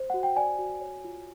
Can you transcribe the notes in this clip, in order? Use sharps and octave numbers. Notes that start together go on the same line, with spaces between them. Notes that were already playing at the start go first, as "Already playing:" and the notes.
Already playing: C5
F#4 F#5
G5
D5 G#5
F#4
C#5
F4